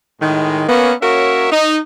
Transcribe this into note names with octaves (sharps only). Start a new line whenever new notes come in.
A2 D#3 G#3
A#3 B3 C#4
A#3 C#4 F#4 A#4 C#5 E5
D#4